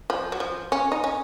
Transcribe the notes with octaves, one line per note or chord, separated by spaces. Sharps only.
F3
F#3
F3
C#4
D#4
C#4